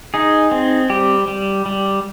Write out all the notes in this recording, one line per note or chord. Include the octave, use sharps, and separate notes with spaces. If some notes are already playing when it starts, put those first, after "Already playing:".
D#4 G#4
C4
G3 G4
G3
G3